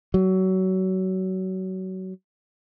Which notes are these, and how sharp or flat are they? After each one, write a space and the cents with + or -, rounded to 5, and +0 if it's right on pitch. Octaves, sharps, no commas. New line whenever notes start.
F#3 +25